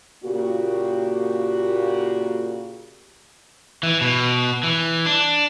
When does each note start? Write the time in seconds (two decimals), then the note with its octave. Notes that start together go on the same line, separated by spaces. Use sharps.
0.24 A#2 C#3 A#3 F#4 G4
3.83 E3
4.01 B2
4.63 E3
5.06 D4